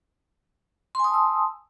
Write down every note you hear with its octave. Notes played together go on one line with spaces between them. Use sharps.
G#5 A5 C6 D#6 E6